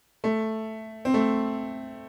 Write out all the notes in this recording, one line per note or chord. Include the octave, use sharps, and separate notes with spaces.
A3
C4
A3